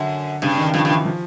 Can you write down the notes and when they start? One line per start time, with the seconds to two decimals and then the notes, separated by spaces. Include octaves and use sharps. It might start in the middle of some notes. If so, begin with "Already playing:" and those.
Already playing: F#2 D3
0.42 G2 C#3
0.58 D#3
0.74 G2 F3
0.85 G2
0.90 E3
1.05 F3